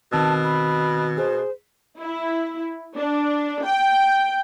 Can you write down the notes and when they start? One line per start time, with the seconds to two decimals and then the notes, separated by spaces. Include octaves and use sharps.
0.13 B2 D#3 C4 A5 E6
0.44 B5
1.18 G#4 C5
1.99 E4
2.97 D4
3.66 G5